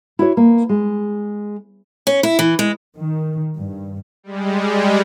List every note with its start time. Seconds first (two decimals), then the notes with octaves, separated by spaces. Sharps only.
0.19 E4 F#4 C#5
0.37 A#3
0.69 G#3
2.07 C#4
2.23 E4
2.39 E3
2.59 G#3
2.97 D#3
3.58 G2
4.23 G3 G#3